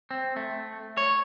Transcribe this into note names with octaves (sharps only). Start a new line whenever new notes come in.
C4
A3
C#5